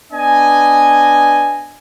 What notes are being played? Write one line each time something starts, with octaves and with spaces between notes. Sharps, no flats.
B3 D4 D#5 G#5